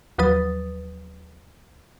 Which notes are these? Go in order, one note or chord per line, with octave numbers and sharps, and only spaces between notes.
D#2 F3 F#3 B4 D#6 A6